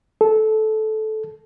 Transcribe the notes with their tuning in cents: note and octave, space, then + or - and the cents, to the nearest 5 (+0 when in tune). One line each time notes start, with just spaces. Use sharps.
A4 -15